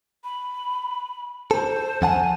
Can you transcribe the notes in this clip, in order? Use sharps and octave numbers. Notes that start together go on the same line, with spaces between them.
B5
A4 C5
F2 F#5 G#5 A5